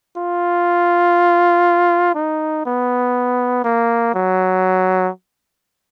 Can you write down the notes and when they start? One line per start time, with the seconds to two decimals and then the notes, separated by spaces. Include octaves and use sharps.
0.17 F4
2.15 D#4
2.65 B3
3.64 A#3
4.14 F#3